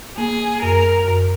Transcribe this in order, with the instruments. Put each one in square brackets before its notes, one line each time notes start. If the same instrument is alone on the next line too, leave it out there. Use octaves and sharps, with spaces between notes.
[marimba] A#3 [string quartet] G#4
[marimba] F#2 [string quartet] A#4
[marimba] F#2